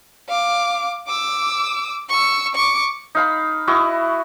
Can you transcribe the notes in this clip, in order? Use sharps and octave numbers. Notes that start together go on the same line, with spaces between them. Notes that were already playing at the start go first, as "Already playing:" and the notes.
F5 D6
D6 E6
C#6 E6
C#6 D6
D#4 F5 B5
E4 F#4 D#5 C#6